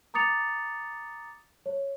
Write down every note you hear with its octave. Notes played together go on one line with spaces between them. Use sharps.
A#5 D6 D#6 A6 C#7 F7
C#5